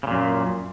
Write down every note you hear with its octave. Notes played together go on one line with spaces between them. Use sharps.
F#2 A#2 C#3